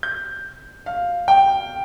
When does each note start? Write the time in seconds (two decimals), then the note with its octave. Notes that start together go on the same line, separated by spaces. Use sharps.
0.03 G6
0.86 F5
1.28 G5